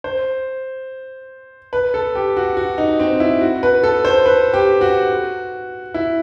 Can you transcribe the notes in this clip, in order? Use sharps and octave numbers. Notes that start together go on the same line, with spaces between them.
C5
B4
A4
G4
F#4
F#4
D#4
C4
E4
F#4
B4
A4
C5
B4
G4
F#4
E4